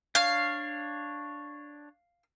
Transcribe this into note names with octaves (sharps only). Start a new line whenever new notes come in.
D4 C#5 F5